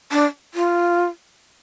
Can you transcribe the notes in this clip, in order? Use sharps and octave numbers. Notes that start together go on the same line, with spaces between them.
D4
F4